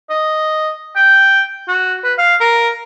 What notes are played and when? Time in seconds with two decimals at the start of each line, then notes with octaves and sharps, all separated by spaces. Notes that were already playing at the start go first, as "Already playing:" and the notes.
0.10 D#5
0.96 G5
1.68 F#4
2.04 B4
2.18 F5
2.40 A#4